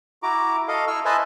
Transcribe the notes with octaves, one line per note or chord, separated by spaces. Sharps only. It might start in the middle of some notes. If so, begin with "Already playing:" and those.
E4 F#4 A#5 D6
A4 D#5 F5
E4 C#6 E6 F6
B4 C5 D#5 E5 G#5 A5